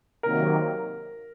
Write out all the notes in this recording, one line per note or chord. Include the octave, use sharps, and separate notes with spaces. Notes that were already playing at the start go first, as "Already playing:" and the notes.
C3 D#3 F#3 A#3 A#4